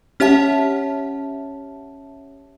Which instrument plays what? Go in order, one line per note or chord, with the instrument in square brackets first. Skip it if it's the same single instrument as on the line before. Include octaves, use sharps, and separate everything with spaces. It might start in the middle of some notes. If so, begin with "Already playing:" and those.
[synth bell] C#4 G4 C#5 E5 F#5 A5